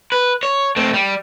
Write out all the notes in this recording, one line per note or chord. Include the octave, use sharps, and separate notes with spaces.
B4
C#5
A3 C4
G3